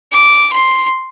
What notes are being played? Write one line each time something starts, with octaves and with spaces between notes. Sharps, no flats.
D6
C6